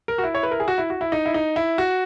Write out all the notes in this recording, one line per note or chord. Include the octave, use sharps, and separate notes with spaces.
A#4
F#4
E4
C#5
B4
A#4
G#4
F#4
E4
F#4
E4
D#4
E4
D#4
E4
F#4